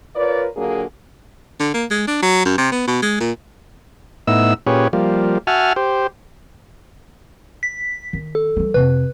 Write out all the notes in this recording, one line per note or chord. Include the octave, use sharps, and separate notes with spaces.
F4 A#4 B4 C#5 D5
A#2 D3 F#3 A#3 D4 G#4
D3
A#3
G#3
D4
F#3
F#2
C3
B3
B2
G#3
A#2
A2 B3 D#4 E4 E6
A#2 C#4 G4 G#4 B4 C#5
F3 G3 A#3
F#4 E5 F#5 G#5 A5 F6
G4 C5
B6
D#3
A4
E3 G3
F2 C3 B4